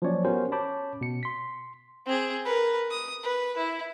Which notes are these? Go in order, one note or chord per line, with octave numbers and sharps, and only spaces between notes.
F3 F#3 A#3 C#4 C#5 D5
B3 C#4 F#4 G4 A#4 C5
C#4 C#5 A5 B5 D6 G6
B2 C#7
C6 B6
C4 G#4
A#4 B4
D#6
B4
E4